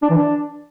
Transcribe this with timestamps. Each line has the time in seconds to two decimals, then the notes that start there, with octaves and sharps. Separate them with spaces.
0.03 D4
0.10 E3
0.18 D4